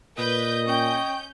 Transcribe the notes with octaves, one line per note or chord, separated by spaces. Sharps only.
A#2 B4 D#5 G6
C#4 G5 C#6 G6